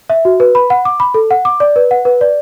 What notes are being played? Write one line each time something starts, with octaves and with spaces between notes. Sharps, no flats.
E5
F#4
B4
B5
F#5
D6
B5
A4
F#5
D6
D5
B4
F#5
B4
D5